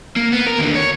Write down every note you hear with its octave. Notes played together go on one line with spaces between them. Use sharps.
A#3
B3
A#4
D#2 D3
C#5